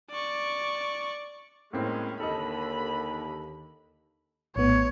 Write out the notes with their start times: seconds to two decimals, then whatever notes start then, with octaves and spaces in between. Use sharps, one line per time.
0.11 D5 C#6
1.73 A2 G#3 A#3 C4 C#4
2.20 D#2 D3 A4 D#5 B5
4.56 A#1 A2 B3 C#5